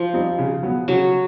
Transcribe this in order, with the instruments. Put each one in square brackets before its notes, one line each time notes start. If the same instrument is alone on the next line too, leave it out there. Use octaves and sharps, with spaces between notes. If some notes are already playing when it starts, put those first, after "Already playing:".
Already playing: [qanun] F3
[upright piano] G3 C4 D#4
C#3
F#3 B3
[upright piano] C#3 [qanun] F#3